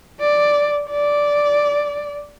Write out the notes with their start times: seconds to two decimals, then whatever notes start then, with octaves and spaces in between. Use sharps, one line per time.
0.20 D5
0.91 D5